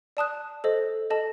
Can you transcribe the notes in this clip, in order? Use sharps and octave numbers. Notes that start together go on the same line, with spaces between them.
D5 A5 D#6 F#6
A4 C5 D#5
A4 D#5 A5